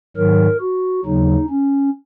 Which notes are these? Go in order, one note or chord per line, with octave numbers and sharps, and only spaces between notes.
G#2 D#3 F#3 A#4
F#4
D#2 C#3 F#3 D#4
C#4